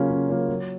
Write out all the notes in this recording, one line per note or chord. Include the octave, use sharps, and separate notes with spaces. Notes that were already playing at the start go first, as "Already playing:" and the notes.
Already playing: C#3 F#3 A#3 C#4 F4
C#3
F#3 A#3 C#4 F4
F#3